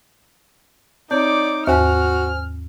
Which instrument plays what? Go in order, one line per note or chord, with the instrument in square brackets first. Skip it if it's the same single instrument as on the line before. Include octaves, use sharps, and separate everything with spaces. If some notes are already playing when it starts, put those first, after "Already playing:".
[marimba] C4 [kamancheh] D#4 D6 [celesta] C#5 G6 [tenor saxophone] D5
[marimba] D#2 G#2 [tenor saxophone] F#4 [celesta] C5 G#5 [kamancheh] F6